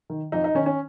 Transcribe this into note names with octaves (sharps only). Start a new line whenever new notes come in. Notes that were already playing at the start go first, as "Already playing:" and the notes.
D#3
F2 D#4
D#4
D#3 C#4
C#4